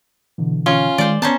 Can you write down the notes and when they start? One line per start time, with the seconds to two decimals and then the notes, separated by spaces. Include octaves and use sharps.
0.38 B2 D3 E3
0.66 C#4 F4
0.98 D#3 G#3 C5 D5
1.22 B3 C#4 C5 A5 A#5